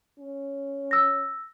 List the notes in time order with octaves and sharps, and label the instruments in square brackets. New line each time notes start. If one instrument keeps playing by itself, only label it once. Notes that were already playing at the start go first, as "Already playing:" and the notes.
[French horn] C#4
[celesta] E6 A#6